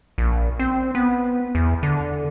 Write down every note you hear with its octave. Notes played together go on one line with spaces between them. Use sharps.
A#1
C4
B3
E2
D3